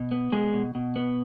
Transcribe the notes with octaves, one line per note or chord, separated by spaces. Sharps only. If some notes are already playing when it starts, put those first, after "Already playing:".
Already playing: B2
B3
B2 G#3 G#4
B2
B2
B3